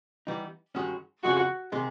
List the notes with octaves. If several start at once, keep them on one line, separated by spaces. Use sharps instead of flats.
E3 G3 B3 D#4
G2 D#3 G#3 C#4 F#4
F2 C#3 F3 G#3 F#4
C3 D#3 G#3